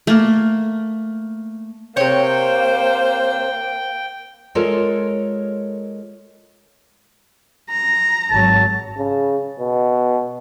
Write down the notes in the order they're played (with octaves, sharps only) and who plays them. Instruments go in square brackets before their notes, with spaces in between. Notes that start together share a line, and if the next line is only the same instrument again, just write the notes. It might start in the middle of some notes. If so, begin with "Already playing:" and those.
[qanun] A3 A#3
[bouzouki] C3 C#5 [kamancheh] A#3 [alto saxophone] C5 [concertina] G5
[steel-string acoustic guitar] G#3 F4 A4 A#4 C#5
[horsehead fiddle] A#5
[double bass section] G#1 F#3 [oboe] A5
[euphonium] C#3
B2